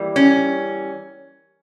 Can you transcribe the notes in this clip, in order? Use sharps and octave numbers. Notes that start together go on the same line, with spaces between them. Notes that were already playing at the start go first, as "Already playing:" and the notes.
Already playing: E3 G3 A#3
C#4